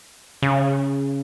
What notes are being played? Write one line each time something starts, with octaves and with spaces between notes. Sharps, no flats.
C#3